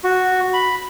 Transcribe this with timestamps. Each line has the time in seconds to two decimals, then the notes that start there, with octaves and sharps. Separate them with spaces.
0.04 F#4
0.53 B5